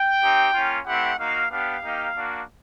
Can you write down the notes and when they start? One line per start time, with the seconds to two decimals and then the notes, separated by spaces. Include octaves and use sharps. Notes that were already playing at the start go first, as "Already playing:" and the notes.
Already playing: G5
0.22 C4 D#4 G4
0.54 A#3 C#4 F4
0.86 A3 C4 E4 G4 F#5
1.19 A#3 D#4 F#4 F5
1.51 B3 D4 G4 F5
1.84 A#3 D#4 G4
2.16 A#3 D4 F#4